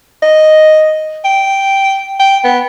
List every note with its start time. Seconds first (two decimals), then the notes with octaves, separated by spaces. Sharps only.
0.23 D#5
1.25 G5
2.20 G5
2.44 B3